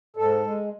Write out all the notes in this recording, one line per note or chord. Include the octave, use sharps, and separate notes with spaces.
G#2 A4
G#3